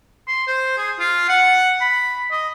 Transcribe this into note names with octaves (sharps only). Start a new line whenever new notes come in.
C6
C5
G#4
F4
F#5
B5
D#5